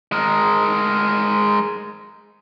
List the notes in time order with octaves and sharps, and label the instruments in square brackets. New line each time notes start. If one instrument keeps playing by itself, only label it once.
[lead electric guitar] G#3 A#4